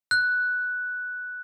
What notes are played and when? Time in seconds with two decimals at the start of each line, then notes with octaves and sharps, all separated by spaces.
0.11 F#6